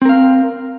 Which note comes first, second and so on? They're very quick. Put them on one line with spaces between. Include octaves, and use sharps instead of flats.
C4 A#4 F5